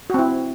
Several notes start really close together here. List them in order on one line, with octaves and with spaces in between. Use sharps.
F#4 C4 E4